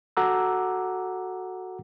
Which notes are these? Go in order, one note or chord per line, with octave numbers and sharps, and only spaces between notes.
F#4 A4 F#5 A#5 D6 E6